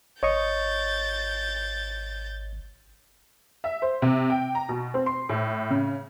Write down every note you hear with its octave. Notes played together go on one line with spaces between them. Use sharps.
G#1 C#5 D#5 C#6 G6 A6
E5
C5
C3
G5
A#5
B2
C4
C6
A2
C#3